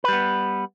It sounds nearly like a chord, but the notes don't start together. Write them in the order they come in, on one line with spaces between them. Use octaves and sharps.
B4 G3 B3